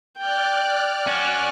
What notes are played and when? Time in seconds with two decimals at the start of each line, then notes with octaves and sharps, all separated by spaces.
0.18 D5 G5 F6 F#6
1.07 C#4 F#4